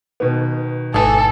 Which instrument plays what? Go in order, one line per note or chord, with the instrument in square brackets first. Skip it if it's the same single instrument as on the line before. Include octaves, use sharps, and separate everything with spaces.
[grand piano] B2 D#3 B3
[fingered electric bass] G#1 [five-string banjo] E3 G#4 [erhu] A4